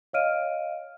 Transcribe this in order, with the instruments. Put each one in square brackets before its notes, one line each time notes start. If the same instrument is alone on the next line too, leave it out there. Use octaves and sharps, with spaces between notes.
[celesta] C#5 D#5 F5 F6 D7 D#7